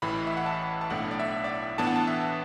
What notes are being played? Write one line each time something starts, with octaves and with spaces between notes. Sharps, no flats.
A1 A2 E3 B5
E5
F#5
A5
A5
B1 A2 A3 D4 F#5
D5
E5
D5
E5
A2 E3 B3 D4 A5
F#5
A5
E5